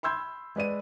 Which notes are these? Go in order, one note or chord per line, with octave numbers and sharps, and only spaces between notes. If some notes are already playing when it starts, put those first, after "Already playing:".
B5 C6 E6 G6 G#6
G#3 B4 D5 D#7